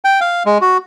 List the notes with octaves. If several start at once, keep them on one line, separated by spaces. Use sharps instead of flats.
G5
F5
G#3
F#4